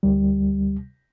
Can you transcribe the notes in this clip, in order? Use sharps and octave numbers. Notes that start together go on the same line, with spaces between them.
D2 G3